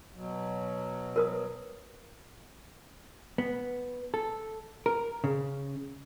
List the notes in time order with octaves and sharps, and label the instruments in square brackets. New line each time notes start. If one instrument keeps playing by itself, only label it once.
[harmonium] B2 F#3
[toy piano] A#4 B4 D#6
[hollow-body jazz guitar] B3
A4
A#4
C#3